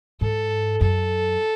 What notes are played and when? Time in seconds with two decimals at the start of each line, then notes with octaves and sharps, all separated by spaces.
0.21 G#2 A4
0.81 F#2 A4